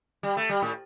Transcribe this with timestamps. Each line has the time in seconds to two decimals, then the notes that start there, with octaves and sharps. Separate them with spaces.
0.23 G3
0.37 A3
0.49 G3
0.62 A2